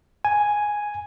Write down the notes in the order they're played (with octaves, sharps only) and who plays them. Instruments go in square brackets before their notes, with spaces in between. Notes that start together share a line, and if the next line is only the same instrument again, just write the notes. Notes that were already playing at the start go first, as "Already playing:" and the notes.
[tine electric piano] G#5